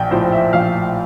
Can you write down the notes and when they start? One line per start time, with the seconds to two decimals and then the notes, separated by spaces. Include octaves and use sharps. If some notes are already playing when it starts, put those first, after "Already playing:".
Already playing: A#1 G5
0.11 A2 F3 C5
0.32 E5
0.53 A#1 F5